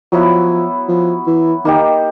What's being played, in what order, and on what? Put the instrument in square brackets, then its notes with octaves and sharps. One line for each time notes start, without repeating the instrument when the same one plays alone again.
[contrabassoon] F3 [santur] F#3 B3 E4
[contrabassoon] F3
E3
[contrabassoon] D#3 [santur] A#3 D#4 G4